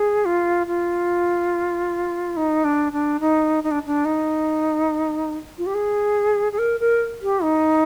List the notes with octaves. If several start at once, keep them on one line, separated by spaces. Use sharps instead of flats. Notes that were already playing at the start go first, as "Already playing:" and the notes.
Already playing: G#4
F4
F4
D#4
D4
D4
D#4
D#4
D4
D4
D#4
F4
G4
G#4
G#4
A#4
A#4
G4
D#4